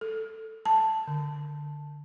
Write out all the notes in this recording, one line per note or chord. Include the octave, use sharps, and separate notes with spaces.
A4
A5
D3